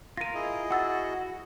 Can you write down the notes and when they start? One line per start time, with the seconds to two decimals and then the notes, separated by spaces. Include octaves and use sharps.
0.17 F4 A#4 A#6 D#7
0.34 E4 G#4 D#5
0.71 F#4 F#5 E6 A6